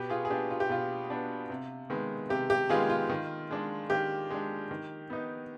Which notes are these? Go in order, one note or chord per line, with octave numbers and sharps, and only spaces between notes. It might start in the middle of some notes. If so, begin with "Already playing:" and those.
Already playing: B2 G4 B4
F4 G#4
G#4
B3 D4 G4
F4
G4
B2 F4
B3 D4
C3
D#3 G#3 B3
C3 G4
G4
D#3 G#3 B3 F4 G#4
F4
D#3
G#3 D4
D#3 G4
G#3 D4
D#3
B3 D#4